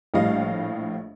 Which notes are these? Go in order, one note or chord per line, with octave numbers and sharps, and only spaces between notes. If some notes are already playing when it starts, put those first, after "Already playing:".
A#1 A2 G3 D#5 F5